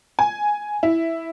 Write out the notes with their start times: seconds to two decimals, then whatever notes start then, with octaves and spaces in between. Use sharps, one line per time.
0.19 G#5
0.83 E4